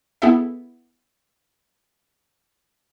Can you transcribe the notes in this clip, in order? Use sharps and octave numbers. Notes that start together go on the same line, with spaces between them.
B3 E4 G#4 A4 E5